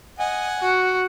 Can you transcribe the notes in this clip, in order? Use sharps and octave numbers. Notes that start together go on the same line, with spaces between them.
D#5 F#5 G#5
F#4